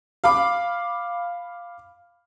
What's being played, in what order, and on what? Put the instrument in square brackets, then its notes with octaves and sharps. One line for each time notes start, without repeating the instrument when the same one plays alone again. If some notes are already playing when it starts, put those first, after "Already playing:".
[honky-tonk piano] F5 B5 D6